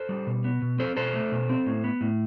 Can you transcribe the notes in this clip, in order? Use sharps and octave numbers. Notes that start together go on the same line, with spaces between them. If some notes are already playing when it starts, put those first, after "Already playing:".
Already playing: A4 C5
G3
B2
B3
B2
C4 A4 C5
B2 A4 C5
A3
B2
C4
A2
B3
A2